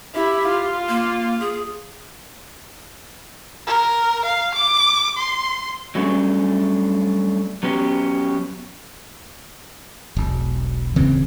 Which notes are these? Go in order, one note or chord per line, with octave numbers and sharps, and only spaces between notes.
E4 G4
F4
A#3
G#4
A#4
F5
D6
C6
F#3 G3 A3 C#4 D4 G#4
F#3 B3 C#4 G4
E1 B1
D1 C#3 E3 C4